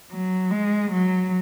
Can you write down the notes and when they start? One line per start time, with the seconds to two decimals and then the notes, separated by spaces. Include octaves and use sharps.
0.11 F#3
0.51 G#3
0.91 F#3